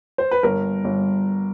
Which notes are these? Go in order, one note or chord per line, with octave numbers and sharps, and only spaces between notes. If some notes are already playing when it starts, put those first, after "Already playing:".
C5
B4
G1 A#4
G1